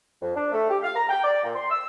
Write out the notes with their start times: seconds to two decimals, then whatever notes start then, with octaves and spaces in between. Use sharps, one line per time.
0.22 F2
0.36 D4
0.52 A3
0.70 G4
0.83 F5
0.95 A#5
1.09 G5
1.24 D5
1.43 A#2
1.55 C6
1.70 E6